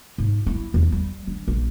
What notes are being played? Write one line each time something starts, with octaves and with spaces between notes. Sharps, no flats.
G#2
E4
E2
G3
D3
A#1